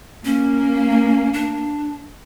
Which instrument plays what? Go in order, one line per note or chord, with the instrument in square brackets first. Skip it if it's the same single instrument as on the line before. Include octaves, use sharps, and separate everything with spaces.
[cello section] A#3 [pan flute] C#4
[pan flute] D4